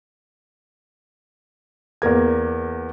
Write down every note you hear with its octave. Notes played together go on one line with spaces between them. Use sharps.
E2 A#3 A#4 G#6